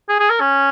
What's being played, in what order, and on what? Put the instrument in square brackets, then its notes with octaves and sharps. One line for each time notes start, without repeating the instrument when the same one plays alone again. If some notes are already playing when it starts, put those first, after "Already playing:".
[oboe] G#4
G#4
A#4
C#4